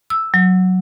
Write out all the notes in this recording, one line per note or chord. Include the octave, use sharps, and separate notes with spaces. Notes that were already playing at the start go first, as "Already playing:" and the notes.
E6
F#3